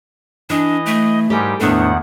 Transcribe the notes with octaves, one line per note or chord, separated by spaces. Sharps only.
E3 D4 D#5
A3
G#2 G3 G4 A#4 G#5
E2 A2 D#3 A3 B3 D4 F#5